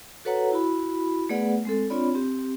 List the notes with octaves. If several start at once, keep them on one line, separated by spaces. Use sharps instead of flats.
F#4 A4 B4 C#5 F#5 A#5
E4 F#4 B5
A3 B3 G#4 B4 D5 F#5
G#3 C4 A4
C4 D4 F4 C#5 D5 B5
C4 G4